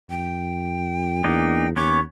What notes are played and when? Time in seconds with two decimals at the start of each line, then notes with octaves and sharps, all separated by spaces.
0.10 F2 G5
1.24 E2 A#3 D4 D#4
1.76 D#2 B3 C#4 C#5 D6